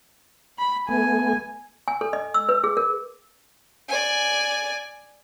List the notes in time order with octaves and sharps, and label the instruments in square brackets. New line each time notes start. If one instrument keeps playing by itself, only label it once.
[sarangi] B5
[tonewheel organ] A3 B3 [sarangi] G#5
[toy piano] G#5
A4
D#5
E6
B4
G#4
A#4
[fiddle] D5 G#5